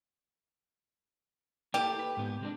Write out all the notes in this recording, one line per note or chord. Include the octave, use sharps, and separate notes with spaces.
A#3 E4 G4 A4
B4
G#2 B3
C3 G#3 D4